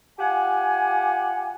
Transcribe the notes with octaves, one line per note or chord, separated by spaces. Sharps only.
F4 G4 F#5 G#5